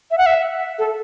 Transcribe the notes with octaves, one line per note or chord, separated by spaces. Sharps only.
E5
F#5
E5
A4